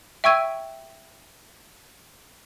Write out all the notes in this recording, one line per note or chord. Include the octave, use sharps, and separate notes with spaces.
E5 G5 C#6 E6 G#6 D#7